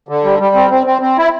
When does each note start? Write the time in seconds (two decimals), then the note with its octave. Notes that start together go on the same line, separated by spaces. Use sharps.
0.09 D3
0.24 G3
0.39 G3
0.55 C4
0.71 C4
0.87 C4
1.02 C4
1.18 E4